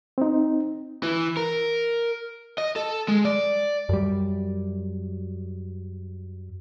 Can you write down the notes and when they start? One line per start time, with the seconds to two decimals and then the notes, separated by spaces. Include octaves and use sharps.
0.18 C4 D#4
1.03 E3
1.37 A#4
2.58 D#5
2.76 A4
3.08 G#3
3.25 D5
3.89 F#2 G3